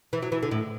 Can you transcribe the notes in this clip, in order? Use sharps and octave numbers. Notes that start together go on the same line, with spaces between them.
E3
F#3
E3
D3
A2